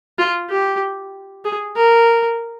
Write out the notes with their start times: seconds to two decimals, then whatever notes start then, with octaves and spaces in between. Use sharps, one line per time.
0.18 F4
0.50 G4
1.45 G#4
1.76 A#4